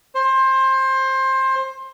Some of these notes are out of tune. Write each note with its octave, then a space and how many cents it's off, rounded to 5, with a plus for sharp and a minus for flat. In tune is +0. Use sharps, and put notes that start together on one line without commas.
C5 +20